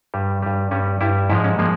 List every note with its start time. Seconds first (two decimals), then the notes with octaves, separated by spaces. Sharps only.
0.14 G2 G3
0.42 G2 G3
0.71 G2 G3 C#4
1.01 G2 G3 E4
1.30 G#2 F3 G#3 E4
1.44 C#4
1.59 F3 G#3 A#3